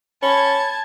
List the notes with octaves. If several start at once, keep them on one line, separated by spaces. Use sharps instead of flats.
C#4 A5 B5 G#6